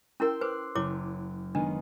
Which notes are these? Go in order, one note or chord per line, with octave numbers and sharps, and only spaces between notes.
C#4 E4 A#4 G5 C6 E6
B4 C5 D6 F#6 C7
F#1 E4 C#5 D6
D#3 G#3 B3 D4